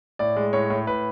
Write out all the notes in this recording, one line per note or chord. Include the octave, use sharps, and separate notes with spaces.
A2 D5
G#3
A2 C#5
A2
A2 B4